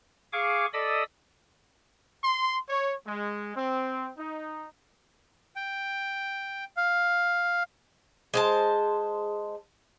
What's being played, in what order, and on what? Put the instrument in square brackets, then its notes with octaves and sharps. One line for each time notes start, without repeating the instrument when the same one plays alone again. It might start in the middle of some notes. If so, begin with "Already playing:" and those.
[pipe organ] G#4 F5 G#5 C#6 D6
A4 D5 D#5 B5 D#6 E6
[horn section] C6
C#5
G#3
C4
D#4
[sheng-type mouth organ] G5
F5
[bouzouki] G#3 C5 A5